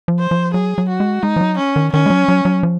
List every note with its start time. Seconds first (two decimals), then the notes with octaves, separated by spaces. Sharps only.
0.08 F3
0.19 C5
0.31 F3
0.54 F#3 G#4
0.78 F#3
0.89 F#4
1.00 G#3
1.23 G#3 D#4
1.36 F3
1.41 F#3
1.58 C#4
1.76 D#3
1.93 D#3 C#4
2.06 G#3
2.10 F#3
2.28 F#3
2.45 F#3
2.63 F3